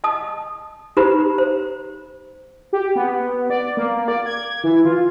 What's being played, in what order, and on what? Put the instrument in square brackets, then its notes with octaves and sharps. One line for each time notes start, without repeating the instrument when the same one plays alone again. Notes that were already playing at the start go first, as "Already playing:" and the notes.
[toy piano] D#5 A5 D#6
D#4 G4 B4 C5 A#5 B5
C5
[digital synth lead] G4
B3
D5
A#3
D5
G#6
E3
F4